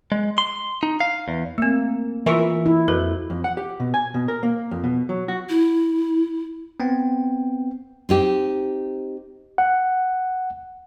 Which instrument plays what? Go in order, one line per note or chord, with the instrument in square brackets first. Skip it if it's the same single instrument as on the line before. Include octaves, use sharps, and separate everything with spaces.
[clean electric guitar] G#3
C6
D#4
F5
E2
[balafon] A3 C4 [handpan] A#3
[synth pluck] E3 A#4 [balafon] F4 C#6 [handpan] E5
[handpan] E4
[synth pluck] F2 [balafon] F#4 A#4 B4
[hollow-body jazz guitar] F2
F#5
G4
B2
G#5
B2
A#4
A#3
F2
B2
F#3
F#4
[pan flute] E4
[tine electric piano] B3 C4 G5
[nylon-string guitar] C4 D#4 G4
[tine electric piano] F#5